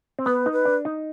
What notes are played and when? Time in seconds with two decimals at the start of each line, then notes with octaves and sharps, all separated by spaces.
0.19 C4
0.26 B3 B4
0.46 D#4
0.52 B4
0.65 D4
0.85 D#4